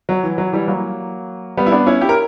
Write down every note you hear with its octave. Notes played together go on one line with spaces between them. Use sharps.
F#3
E3
F#3
E3 G3
F#3 A#3
G3 B3
E4
B3 D4
C#4 E4
E4 G4
A#4